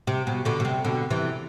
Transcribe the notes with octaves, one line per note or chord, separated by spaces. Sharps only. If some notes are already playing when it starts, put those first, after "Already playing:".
C3
B2
B2 D3
B2
C3
B2 D3
C3 E3